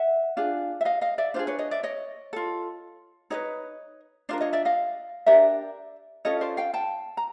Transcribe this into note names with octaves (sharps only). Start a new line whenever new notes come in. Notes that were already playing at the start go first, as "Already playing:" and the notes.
Already playing: E5 F#5
D4 F4 G#4
E5
D#5 F5
D#5 F5
D5 E5
D4 F4 G#4 C5
B4 C#5
C#5 D#5
D5 E5
C#5 D#5
F4 A4
D#4 G#4 B4 C#5 D#5
D4 F4 A#4 C5 D5
C#5 D#5
D5 E5
D#5 F5
D4 G4 A#4 D5 E5
C#4 F4 A4 C#5 D#5
C5 D5
F5 G5
G5 A5
A#5